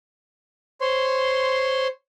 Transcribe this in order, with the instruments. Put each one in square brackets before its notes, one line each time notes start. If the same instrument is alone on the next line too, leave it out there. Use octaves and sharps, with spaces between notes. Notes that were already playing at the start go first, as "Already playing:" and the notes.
[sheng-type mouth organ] C5 C#5 C6